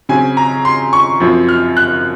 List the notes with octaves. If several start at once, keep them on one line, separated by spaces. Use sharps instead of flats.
C#3 F#3 C4 G#5
A#5
C6
C#6
F#2 F3 C4
F6
F#6